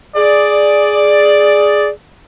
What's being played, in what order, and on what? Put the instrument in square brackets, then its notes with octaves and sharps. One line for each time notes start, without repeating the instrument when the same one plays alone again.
[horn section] G#4 D5